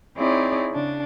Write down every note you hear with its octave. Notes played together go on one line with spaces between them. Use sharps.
C4 D#4 E4 G#4 C#5 D5
C#3 D4